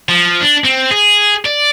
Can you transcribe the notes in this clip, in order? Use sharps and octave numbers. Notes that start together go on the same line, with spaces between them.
F3
D4
C4
G#4
D5